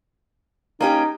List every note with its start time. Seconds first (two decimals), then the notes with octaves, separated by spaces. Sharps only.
0.81 A#3 C#4 D#4 G4